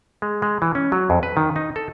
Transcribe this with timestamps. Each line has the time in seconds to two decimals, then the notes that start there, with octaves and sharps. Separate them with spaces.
0.22 G#3
0.42 G#3
0.62 E3
0.75 C#4
0.92 F#3
1.10 F2
1.23 B4
1.37 D#3
1.56 D#4
1.76 A4